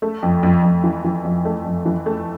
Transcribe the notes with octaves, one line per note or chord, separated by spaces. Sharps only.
A3
F2
F2
F2
E3
E3
F2
A3
F2
E3
A3